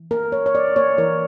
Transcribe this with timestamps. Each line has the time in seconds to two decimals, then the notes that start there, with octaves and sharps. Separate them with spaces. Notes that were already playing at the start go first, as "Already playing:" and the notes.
Already playing: E3
0.11 A#3 A#4
0.32 A#3 C#5
0.46 C#5
0.55 A#3 D5
0.76 A#3 C#5
0.98 E3 A#4